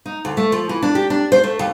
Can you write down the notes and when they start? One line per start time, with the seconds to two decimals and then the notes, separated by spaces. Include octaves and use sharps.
0.06 D#4
0.25 D2
0.37 A3
0.52 F3
0.69 E3
0.82 D4
0.95 G4
1.10 D4
1.32 C5
1.44 A3
1.59 D#2